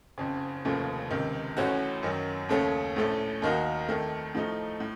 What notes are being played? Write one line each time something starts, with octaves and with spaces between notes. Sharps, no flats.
F#1 F2 C#3
F1 D#2 C#3 F3 A3
C#2 C3 D#3
A1 A2 A3 C#4 F#4
F#2 D#3 F#3
D#2 C#3 A3 C#4 A4
A#1 A2 A3 C#4 A4
D#2 D#3 A#3 D#4 F#4
F2 D#3 A3
A2 F3 A3 D#4
A2